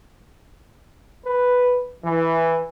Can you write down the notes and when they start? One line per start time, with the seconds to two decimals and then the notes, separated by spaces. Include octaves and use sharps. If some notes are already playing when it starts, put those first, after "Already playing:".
1.26 B4
2.04 E3